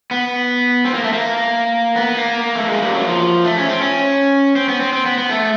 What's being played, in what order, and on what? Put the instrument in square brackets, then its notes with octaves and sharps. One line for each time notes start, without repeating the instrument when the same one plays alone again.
[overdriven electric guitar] B3
C4
A#3
A3
A#3
B3
A#3
A3
G#3
G3
F#3
F3
A3
C#4
C4
C#4
C4
B3
C4
C4
B3
B3
A3